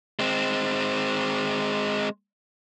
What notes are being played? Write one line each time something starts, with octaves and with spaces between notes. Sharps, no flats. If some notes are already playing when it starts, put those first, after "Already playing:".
G#3 C4